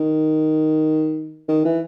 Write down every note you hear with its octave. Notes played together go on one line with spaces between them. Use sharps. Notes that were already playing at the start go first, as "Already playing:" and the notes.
Already playing: D#3
D#3
E3